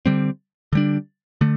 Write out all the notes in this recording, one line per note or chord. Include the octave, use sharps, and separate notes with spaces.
D3 G3 C4
D3 G3 D4
D3 A3